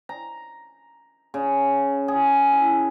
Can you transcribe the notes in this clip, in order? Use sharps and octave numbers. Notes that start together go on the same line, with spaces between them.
A#5
C#3
G#4
E4